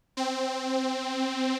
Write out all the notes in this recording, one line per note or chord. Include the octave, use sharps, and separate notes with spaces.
C4